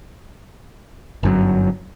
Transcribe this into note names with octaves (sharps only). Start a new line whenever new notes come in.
G1 F#2 F#3